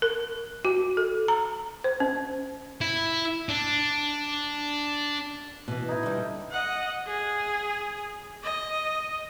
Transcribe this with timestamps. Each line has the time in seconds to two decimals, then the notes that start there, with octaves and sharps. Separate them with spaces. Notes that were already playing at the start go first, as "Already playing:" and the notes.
0.02 A#4
0.65 F#4
0.97 A4
1.28 A#5
1.84 C5
2.00 C#4
2.81 E4
3.49 D4
5.68 B2 E3
5.89 D#4 E4
6.03 D3 G3
6.51 D#5 F#5
7.07 G#4
8.43 D#5